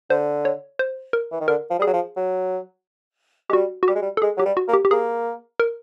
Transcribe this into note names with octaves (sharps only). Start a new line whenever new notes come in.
D3 C5
C#5
C5
A#4
E3
D#3
D3 A#4
F3
G3
F#3 G#4
F3
F#3
G#3 G4
G3 F#4
F#4
G3 G4
G#3
G3
A4
G#3 G#4
F#3 G4
G3
F#4
A#3
G4
G4
A#3 G#4
A#4